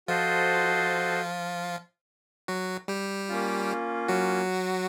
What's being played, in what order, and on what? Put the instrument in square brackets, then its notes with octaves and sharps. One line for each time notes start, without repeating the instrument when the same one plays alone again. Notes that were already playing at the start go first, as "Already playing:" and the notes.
[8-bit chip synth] F3 F4 [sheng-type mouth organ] F#4 A4 C5 D#5
[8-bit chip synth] F#3 F#4
G3 G4
[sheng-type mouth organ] A#3 C#4 F4
[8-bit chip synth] F#3 F#4